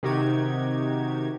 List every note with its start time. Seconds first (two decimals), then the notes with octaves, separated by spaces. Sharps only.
0.03 C3 D#3 D#4 F#4 G4 G#6